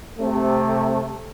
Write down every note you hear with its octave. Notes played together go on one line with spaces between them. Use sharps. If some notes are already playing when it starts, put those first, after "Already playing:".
C3 A3